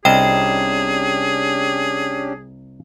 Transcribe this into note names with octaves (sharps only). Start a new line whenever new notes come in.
C2 C#4 D4 G4 G#4 D#5 G5 E7